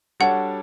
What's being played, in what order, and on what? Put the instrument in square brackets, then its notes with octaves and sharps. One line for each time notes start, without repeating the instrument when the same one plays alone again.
[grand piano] G3 D4 F#4 A4 C#5 [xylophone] F#5